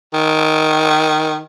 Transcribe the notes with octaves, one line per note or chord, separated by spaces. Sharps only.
D#3